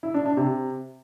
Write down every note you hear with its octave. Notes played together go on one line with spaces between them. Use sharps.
E4
D4
D4
C3